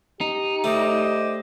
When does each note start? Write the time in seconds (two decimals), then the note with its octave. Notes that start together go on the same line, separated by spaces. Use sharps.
0.21 D#4 G4
0.64 A3 C5 D5 D#5